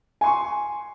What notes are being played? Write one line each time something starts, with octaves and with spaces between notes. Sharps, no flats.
G#5 C6 C#6